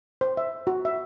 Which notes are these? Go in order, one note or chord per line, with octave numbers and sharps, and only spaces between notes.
C5
E5
F#4
E5